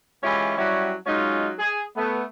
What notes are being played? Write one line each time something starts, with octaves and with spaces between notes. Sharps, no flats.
E3 G#3 C#4 E4 F4 G4
F#3 G3 C#4 E4 F#4 G4
F#3 G#3 C#4 D#4 F4
G#4
A3 B3